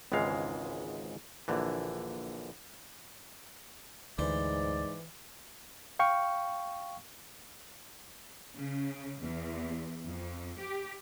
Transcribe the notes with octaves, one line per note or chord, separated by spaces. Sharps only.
G#1 C#2 G#2 E3 G#3 F5
A#1 D3 E3
D2 G#2 E3 C5 D5
F5 G5 C#6
C#3
E2
F2
G4